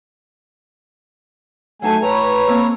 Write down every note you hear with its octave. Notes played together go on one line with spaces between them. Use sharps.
F#3 A3 D#4 G#5 A5
A2 B4 C#5 A#5
A#3 C4 A4